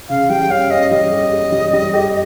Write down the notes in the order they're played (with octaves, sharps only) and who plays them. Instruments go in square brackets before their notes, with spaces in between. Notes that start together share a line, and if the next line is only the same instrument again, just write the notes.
[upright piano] C#3 [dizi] F5
[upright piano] G3 [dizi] G5
[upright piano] C#4 [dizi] F5
[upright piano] C#4 [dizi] D#5
[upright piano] G3 [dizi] D#5
[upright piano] G4
G4
G3
G3
G4